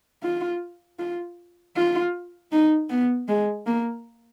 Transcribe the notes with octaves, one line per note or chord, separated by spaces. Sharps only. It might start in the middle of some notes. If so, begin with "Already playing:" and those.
F4
F4
F4
D#4
B3
G#3
A#3